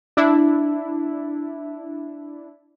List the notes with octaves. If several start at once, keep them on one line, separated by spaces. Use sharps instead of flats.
D4 E4